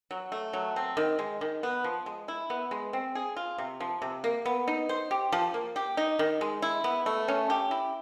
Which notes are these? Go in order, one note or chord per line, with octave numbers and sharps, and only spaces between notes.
F#3
A3
F#3
C4
D#3
G#3
D#3
B3
F3
G#3
E4
B3
G#3
C4
G#4
F4
C3
F3
C3
A#3
B3
D#4
C5
G4
F3
A#3
G4
D#4
D#3
G#3
E4
B3
A3
C#4
G4
E4